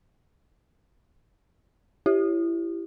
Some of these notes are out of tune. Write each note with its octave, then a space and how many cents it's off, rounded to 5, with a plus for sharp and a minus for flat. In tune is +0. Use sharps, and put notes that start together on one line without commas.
E4 +25 G4 -5